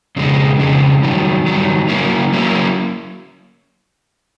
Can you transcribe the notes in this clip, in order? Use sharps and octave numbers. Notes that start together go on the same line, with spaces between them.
F2 C#3 G#3
F2 C#3 G#3
G2 D#3 F#3
G2 D#3 F#3
F#3 A#3 C#4 E4
F#3 A#3 C#4 E4